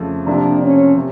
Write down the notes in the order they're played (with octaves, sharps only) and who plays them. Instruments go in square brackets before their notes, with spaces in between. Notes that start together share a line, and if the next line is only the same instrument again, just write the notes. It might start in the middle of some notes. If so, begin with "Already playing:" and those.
Already playing: [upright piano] F2 C#3 F3 A3
[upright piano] C3 F3 A#3 [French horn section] D4
[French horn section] C#4
[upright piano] C3